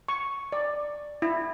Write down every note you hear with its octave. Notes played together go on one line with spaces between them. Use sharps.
C#6
D5
E4